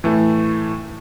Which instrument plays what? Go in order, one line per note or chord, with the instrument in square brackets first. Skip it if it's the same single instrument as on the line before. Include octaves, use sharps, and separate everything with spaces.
[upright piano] A2 E3 A3